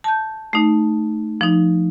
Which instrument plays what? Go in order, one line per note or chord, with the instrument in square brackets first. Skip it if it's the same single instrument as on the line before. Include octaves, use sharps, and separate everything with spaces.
[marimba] A5 G6
A3 D#4
F3 D#4